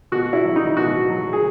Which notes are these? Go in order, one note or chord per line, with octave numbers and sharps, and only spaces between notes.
B2 F#4
E4
F#3
D#4
B2 F#4
F#3
G#4